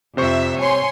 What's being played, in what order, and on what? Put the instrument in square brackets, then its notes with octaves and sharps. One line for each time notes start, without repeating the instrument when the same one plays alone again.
[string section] F2 E5 [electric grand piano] C3 C5 C#6
[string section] C#5 G#5 C6